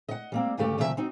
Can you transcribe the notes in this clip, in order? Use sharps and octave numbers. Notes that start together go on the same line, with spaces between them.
D#5 F#5
G3 A#3 C4
D2 G2 C#3 A3 G4 F#5
D2 C3 D#3 F3 G#4 E5
C4 D#4 F#4